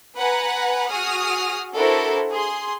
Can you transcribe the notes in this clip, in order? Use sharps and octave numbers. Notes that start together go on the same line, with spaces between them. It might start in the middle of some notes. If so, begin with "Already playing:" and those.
B4 F#5 G#5 A#5
F#4 G#4 D#6 F6
D4 E4 F#4 A4 A#4 C5
G#4 C6